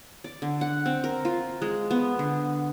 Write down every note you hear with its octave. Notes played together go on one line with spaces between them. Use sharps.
D5
D3
F#5
C4
A#4
F4
G#3
B3
D3